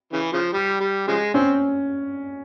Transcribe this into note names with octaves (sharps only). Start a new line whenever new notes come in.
C#3 E3
C#3 F3
G3
G3
C#3 F3 G#3
C4 C#4